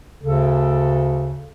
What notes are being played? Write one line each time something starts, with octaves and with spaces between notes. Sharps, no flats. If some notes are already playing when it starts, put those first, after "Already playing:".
D2 C#3 A4